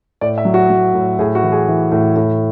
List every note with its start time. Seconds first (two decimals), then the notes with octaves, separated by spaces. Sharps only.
0.21 A2 D5
0.38 E5
0.45 F#3
0.54 F#4
0.70 F#3
0.94 A2
1.19 A2 G#4
1.35 F#4
1.43 E3
1.52 G#4
1.68 E3
1.92 A2
2.16 A2